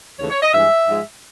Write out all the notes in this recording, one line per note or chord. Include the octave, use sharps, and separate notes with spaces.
D#2 C#3 E3 A3 C#5
C#5
D#5
G2 E3 G#3 E5
G#2 F3 G#3